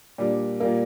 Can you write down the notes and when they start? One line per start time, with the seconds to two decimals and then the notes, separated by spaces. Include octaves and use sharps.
0.18 A#2 G3 D4
0.60 A#2 G3 A#3